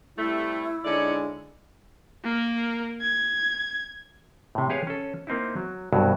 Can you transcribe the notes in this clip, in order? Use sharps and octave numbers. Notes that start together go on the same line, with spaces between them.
C3 G3 A3 E4
D3 G#3 C#4 D#4 A4 D5
A#3 A#4
G#6
A2 C3
G4 G#4 B4 C#5 F5
C#4 A4
A#3 C4 D#4 E4
F#3
C2 G2 B2 F#3